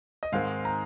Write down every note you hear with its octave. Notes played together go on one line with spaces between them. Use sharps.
D#5
G#2 D#3 G#3 C4 F5
A#5